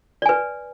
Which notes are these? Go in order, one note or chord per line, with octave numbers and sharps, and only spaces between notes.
B4 D5 G#5